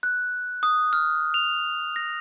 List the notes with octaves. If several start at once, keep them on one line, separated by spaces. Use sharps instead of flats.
F#6
D#6
F6
F7
A#6